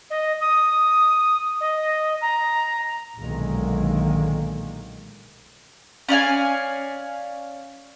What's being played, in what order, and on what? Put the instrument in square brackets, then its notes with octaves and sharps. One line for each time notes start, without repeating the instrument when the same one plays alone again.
[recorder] D#5
D#6
D#5
A#5
[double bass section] B1 A#2 D3 D#3 G#3 A#3
[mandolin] C#4 D5 F5 G#5